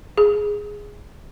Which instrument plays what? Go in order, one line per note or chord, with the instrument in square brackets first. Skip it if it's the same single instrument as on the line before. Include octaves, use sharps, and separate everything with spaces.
[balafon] G#4